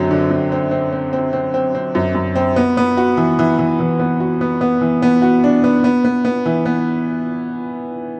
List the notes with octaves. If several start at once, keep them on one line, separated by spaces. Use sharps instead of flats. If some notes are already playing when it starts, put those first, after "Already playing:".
Already playing: F#2 D3 F#3 C4
D3
F#2
C4
C4
C4
C4
C4
C4
C4
F#2
F#2
C4
B3
B3
F#4
E3
E3
E3
E3
B3
F#4
B3
B3
E3
B3
F#4
D4
B3
B3
B3
B3
E3
B3